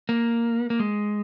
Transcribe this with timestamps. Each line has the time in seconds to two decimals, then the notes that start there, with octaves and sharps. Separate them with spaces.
0.09 A#3
0.70 A#3
0.80 G#3